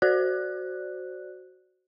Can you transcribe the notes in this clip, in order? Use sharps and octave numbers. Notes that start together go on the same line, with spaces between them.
F#4 C5 D5 F#6